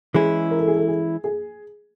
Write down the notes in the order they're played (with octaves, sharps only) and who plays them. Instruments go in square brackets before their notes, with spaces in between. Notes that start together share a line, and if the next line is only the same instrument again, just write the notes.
[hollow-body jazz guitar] E3 G#3 C#4 E4 [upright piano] G#4
[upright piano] A#4
A4
G#4
A4
G#4
G#4